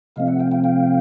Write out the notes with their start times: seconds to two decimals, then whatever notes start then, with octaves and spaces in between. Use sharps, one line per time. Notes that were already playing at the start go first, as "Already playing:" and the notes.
0.16 C3 F3 A3 C4 D#5 F5
0.27 E5 F#5
0.40 F5 G5
0.52 F5 G5
0.64 F5 G5